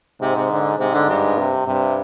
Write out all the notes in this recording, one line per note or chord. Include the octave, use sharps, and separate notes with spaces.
G#2 C3
C3
D3
G#2 C3
D3
G2
C3
G2 C3